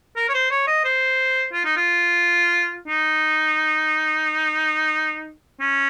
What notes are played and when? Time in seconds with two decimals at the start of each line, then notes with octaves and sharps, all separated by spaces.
0.16 A#4
0.29 C#5
0.34 C5
0.51 C#5
0.67 D#5
0.84 C5
1.53 F4
1.65 D#4
1.76 F4
2.88 D#4
5.61 C#4